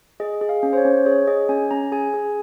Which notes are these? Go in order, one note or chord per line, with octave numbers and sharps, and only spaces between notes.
G#4 D#5
G#4
F5
C#4
C5
C#5
C#4
G#4 C#5
G#4 D#5
C#4 G#5
C#4 A#5
G#4 G#5
G#4